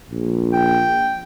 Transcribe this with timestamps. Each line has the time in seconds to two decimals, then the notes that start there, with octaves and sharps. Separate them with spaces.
0.10 A#1
0.53 G5